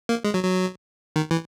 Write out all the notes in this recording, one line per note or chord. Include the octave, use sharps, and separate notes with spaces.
A#3
G#3
F#3
F#3
D#3
E3